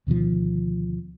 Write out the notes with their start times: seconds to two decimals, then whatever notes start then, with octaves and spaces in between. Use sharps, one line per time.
0.07 D2 B2 D#3 F3